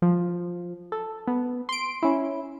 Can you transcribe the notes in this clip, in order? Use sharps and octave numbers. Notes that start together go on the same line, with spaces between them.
F3
A4
B3
C6 D7
C#4 E4